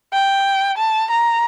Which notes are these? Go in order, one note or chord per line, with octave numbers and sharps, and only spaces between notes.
G5
A5
A#5